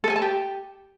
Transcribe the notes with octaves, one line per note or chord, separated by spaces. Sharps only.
A4
G#5
A5
G4